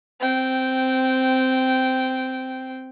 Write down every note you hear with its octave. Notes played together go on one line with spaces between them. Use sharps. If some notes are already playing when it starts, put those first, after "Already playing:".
C4 G5